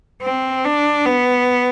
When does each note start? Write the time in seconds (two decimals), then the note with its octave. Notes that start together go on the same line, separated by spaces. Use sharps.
0.22 C4
0.65 D4
1.06 B3